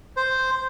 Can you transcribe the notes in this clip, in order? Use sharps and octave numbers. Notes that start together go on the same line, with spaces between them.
C5